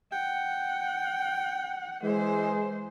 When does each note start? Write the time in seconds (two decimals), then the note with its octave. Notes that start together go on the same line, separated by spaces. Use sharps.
0.12 F#5 G5
2.03 E3 G#3 C5